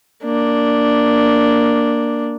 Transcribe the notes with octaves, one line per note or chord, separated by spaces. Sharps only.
A#3 D4